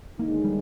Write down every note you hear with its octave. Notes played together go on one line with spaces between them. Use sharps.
D#2 D3 G#3 A#3 D#4
G3